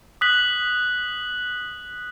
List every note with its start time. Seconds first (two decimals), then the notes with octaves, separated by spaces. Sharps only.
0.21 D#6 F#6 B6 F#7